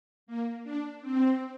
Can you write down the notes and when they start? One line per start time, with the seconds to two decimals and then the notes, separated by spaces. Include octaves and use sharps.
0.27 A#3
0.64 D4
1.01 C4